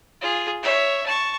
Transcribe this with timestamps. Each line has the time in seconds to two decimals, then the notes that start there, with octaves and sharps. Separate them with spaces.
0.21 F4 G#4
0.63 C#5 E5
1.06 A5 C#6